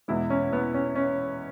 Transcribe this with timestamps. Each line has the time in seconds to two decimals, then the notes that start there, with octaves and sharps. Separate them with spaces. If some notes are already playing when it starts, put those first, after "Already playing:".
0.08 E2 B2 G#3 E4
0.30 C#4
0.53 B3
0.74 C#4
0.95 C#4